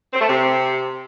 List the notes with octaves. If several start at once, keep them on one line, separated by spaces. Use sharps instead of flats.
C4
A3
C3